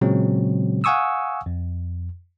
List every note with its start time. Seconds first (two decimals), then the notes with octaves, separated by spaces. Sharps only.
0.01 A#2 C#3 F#3 G#3 C4
0.84 F5 F#5 G#5 C#6 D#6 E6
1.46 F2